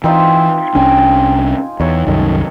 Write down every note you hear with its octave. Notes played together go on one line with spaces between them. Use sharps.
E3 C4 D#4 F4
C2 C#4 D4 G5 G#5
E2 D#4 C#5
C2 F#2 D#3 A4 D#5